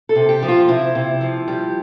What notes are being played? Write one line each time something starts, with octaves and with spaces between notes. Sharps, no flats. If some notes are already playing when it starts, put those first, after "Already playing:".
A4
C3
G4
F3
F4
C3 E4
C3
F3
G3